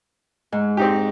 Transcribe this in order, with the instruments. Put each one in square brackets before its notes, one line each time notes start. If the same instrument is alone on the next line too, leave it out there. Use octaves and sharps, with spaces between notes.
[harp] G#2
[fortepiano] C4 D#4 G4